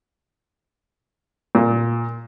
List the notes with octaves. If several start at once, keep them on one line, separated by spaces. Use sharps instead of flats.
A#2